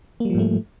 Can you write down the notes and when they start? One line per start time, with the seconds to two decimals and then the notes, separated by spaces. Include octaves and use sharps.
0.20 A#3
0.25 G3
0.30 F3
0.35 G#2
0.39 A3